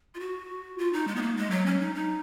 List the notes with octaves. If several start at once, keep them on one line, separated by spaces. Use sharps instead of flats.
F4
F#4
F4
D#4
G#3
B3
A#3
G#3
F#3
C#4
D#4
D#4